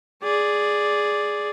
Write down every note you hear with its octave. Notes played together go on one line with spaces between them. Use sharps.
G#4 D5